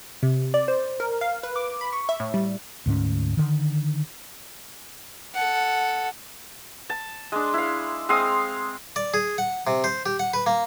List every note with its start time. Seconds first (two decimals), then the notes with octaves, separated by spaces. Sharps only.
0.23 C3
0.54 D5
0.68 C5
1.00 A#4
1.21 F5
1.43 B4
1.56 D6
1.81 B5
1.93 C#6
2.09 E5
2.20 A2
2.34 G3
2.86 D2 G#2 G3 C#4
3.37 D3 D#3
5.34 A4 F#5
6.90 A5
7.32 G#3 D4
7.54 E4 F5
8.09 G#3 C4 F5 D#6
8.96 D5
9.14 G#4
9.38 F#5
9.67 C3
9.84 C5
10.06 G4
10.19 F#5
10.34 B4
10.46 A#3